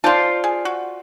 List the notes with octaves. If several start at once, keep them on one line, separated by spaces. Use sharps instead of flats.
F4 C5 D5 F5 A5
G#4
F#4